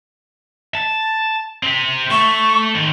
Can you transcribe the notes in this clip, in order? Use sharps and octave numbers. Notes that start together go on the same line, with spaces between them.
A5
C4 G4
A3 E5 C#6
D#3 C4